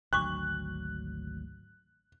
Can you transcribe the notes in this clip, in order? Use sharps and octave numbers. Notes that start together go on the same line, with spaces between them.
G#1 D2 F#3 D4 C#6 D6 F#6